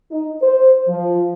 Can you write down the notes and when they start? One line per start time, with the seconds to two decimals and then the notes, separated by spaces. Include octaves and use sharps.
0.12 D#4
0.43 C5
0.88 F3